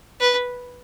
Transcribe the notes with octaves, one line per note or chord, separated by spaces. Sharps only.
B4